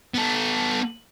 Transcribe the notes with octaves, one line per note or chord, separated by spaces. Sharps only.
B3 A4